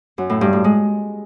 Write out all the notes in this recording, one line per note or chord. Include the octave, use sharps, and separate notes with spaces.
F#2
A2
G2
A2
G#3